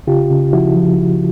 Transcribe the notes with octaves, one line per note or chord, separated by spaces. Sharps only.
C#3 F4 G4
C#3
F3 E4 F#4
F3